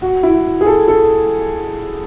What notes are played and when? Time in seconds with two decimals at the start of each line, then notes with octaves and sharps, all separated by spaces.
0.02 F#4
0.23 E4
0.61 G#4
0.66 A4
0.88 A4